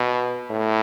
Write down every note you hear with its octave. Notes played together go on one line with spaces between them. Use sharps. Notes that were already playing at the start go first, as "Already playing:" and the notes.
Already playing: B2
A2